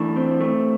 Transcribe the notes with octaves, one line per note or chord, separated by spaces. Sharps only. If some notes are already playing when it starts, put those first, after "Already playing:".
Already playing: E3 A3 D4
C4
A3